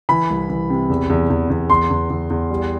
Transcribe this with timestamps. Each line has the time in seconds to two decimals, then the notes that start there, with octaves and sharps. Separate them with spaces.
0.09 E3 B5
0.30 C2
0.49 E3
0.70 C3
0.90 E2
1.10 E2
1.30 E2
1.50 E2
1.70 E2 C6
1.90 E2
2.10 E2
2.30 E2
2.50 G3